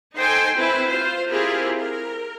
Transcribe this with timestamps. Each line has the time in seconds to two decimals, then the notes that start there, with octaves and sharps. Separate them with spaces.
0.17 D#4 A4 C5 G5 G#5 C6
0.58 C4 E4 B4 C5
0.89 F4 C5
1.30 C4 E4 F4 G4 G#4 A#4
1.80 A#4